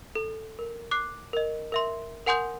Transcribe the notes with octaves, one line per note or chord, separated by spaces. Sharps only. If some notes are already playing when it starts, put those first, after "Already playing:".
A4
A#4
D6 F#6 C7
A#4 D#5
A#4 E5 C6
A#4 F#5 G#5 C6 D#6 G6